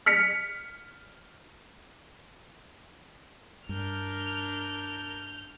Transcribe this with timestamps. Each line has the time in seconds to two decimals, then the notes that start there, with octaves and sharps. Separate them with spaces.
0.06 F6 B6 C#7
3.69 G2 D4 A#4 F6 G6